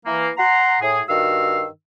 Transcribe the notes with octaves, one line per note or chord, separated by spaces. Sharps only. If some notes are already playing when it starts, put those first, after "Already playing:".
E3 A#3
F#5 A#5 C6
A2 G#4
G2 D#3 F#4 F5 E6